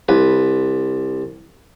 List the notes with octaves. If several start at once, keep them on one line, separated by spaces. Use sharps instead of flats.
C2 B4